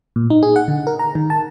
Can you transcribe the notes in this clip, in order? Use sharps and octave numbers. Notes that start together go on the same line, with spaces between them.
A#2
D#4
G#4
F#5
D3
A#4
A#5
D#3
A5